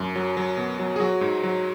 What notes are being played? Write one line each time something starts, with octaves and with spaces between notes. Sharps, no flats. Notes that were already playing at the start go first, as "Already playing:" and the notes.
Already playing: F#2
F#3
F#3
B2
F#3
G#4
F#3 F#4
G#2
F#3